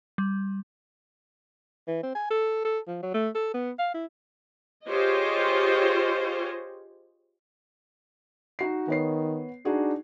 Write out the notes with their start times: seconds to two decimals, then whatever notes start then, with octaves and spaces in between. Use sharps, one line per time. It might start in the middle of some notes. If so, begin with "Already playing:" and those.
0.18 G3
1.87 E3
2.03 C4
2.15 G#5
2.30 A4
2.65 A4
2.87 F3
3.02 F#3
3.14 A3
3.35 A4
3.54 B3
3.79 F5
3.94 E4
4.87 F4 G4 G#4 C5 C#5 D#5
8.59 D#4 F#4 C7
8.88 D#3 B3 C#5 C7
9.65 D4 D#4 F#4 G#4